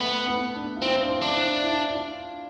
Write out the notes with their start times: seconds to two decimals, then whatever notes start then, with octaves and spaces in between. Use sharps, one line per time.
0.01 A3 B3
0.28 B3
0.55 D4
0.77 F4
0.81 C4 E4
0.94 C4
1.01 D4
1.08 E4
1.22 D4
1.35 E4
1.62 E4
1.88 F4